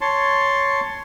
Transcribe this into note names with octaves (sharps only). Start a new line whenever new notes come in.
C#5 A5 C6